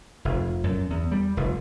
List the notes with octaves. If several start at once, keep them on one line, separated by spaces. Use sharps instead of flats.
F1
F#2
E2
G3
F1